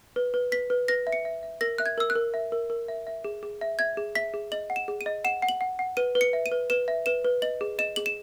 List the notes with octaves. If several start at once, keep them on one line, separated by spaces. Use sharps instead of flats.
B4
B4
B4 B6
B4
B4 A#6
E5
C#7
E5
E5
A#4 A#6
E5 F#6
G#6
A#4 E6
F#6
A#4
E5
A#4
A#4
E5
E5
G#4
G#4
E5
E5 G#6
G#4
E5 B6
G#4
D#5 F#7
F#5
E7
G#4
D#7
D#5
F#5 E7
F#5
F#7
F#5
F#5
B4 D#7
B4
C#7
E5
D#7
B4
B4 E7
E5
B4 E7
B4
D#5 F#7
G#4
D#5 E7
G#4 F#7
E7